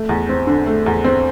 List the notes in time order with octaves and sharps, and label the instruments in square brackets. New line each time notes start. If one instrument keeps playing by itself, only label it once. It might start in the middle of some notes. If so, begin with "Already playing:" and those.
Already playing: [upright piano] A3
E2
C4
D3
A3
E2
C4